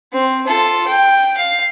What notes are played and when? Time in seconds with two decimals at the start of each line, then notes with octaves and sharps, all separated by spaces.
0.13 C4
0.47 F4 A4
0.88 G5
1.37 F5